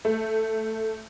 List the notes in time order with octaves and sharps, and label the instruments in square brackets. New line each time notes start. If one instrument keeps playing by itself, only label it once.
[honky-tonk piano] A3